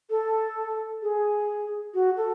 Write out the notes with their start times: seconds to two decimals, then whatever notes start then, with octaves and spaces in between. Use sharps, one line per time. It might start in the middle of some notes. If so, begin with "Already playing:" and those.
0.10 A4
1.03 G#4
1.94 F#4
2.17 A4